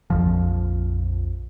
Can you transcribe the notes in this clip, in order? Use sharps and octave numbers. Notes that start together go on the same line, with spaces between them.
A#1 F2 F3